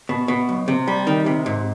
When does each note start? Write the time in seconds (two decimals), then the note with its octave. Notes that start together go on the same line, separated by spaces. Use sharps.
0.09 B2
0.28 B2
0.49 B1
0.68 C3
0.88 G3
1.07 D#3
1.26 C3
1.46 G#2